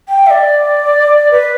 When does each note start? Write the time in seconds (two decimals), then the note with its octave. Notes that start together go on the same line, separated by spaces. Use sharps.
0.09 G5
0.27 E5
0.30 D5
1.31 B4